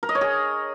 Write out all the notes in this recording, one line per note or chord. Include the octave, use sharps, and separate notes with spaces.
A#4
D#5
C#5
G#4